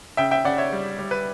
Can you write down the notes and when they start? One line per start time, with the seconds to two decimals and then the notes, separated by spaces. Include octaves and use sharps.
0.17 C#3 E5 G5
0.31 E5 G5
0.44 C#3 D5 F#5
0.58 C#5 E5
0.72 G3
0.99 G3
1.11 B4